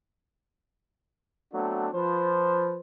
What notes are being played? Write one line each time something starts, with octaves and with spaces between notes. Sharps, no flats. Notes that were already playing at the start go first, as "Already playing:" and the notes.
F#3 A3 B3 C4 D4 F#4
F3 B4 C5